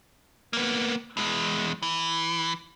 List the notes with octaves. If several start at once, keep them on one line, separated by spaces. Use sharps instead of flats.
A#3 B3
E2 G#3
E3